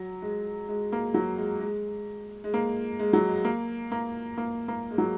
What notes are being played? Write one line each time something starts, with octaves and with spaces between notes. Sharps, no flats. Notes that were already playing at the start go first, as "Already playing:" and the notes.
Already playing: F#3
G#3
G#3
A#3
F#3
G#3
G#3
G#3
A#3
G#3
F#3
G#3
A#3
A#3
A#3
A#3
G#3
F#3